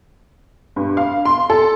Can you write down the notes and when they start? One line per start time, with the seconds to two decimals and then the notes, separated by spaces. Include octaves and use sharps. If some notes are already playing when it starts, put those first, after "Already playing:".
0.76 G2
0.97 F5
1.25 C6
1.50 A4